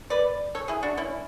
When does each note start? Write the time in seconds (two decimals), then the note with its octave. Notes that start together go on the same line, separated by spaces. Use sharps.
0.10 B4 D5
0.55 A4 C#5
0.68 E4 G#4
0.83 D4 F#4
0.97 C#4 E4